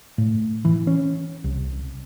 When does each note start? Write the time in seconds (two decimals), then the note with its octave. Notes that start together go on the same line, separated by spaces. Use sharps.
0.18 A2
0.65 E3
0.87 C#4
1.44 C2